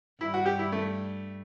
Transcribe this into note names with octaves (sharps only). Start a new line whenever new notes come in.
G2 E4
F#4
G4
E4
A3